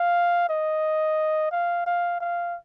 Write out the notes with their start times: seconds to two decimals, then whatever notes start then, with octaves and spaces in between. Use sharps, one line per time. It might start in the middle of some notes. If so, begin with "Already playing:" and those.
Already playing: F5
0.49 D#5
1.51 F5
1.86 F5
2.20 F5